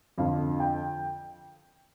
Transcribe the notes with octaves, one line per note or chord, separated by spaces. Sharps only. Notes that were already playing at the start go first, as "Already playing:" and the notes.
F2 D3 F3 F5
G5